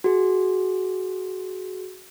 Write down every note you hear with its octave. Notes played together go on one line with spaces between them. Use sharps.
F#4 G#4